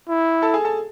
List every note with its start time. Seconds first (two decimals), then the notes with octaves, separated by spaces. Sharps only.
0.09 E4
0.42 A4 A5
0.54 G#4 G#5
0.65 A4 A5